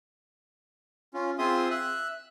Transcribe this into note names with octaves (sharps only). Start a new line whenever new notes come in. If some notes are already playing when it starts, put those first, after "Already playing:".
C#4 F4
C4 F4 G#4 E5 C6 D#6
E5 E6 F#6